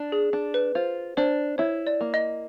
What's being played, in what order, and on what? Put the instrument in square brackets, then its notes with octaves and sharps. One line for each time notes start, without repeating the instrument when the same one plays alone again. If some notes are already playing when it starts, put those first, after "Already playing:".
Already playing: [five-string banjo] D4
[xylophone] G#4
[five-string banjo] D4
[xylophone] B4
[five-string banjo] F4 [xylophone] C5
[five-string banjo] D4 [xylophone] C5
[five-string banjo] E4 [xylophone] C#5
[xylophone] D5
[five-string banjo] A#3
[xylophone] D#5